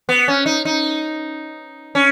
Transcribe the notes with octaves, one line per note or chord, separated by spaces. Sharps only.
B3
C#4
D#4
D#4
C#4